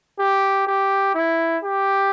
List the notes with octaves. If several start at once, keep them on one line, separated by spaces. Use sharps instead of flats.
G4
G4
E4
G4